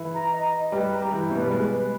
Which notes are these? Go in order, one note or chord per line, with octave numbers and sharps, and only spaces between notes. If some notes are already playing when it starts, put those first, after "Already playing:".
Already playing: E3 E4
A#5
D#5
D#5
G3 G4 B4
A#5
G4
E3 E4 G5
B2 B3 B4
G3
G#3 B4
B4